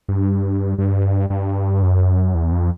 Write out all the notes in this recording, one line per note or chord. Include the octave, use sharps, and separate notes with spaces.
G2
G2
G2
F#2
E2
F2